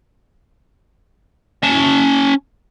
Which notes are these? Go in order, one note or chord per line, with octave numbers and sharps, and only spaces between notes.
C#4 A5